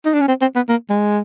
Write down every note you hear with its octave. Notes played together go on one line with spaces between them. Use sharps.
D#4
D4
C#4
C4
C4
B3
A#3
G#3